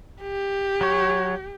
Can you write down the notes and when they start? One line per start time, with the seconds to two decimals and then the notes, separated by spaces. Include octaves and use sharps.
0.22 G4
0.81 F#3 C#5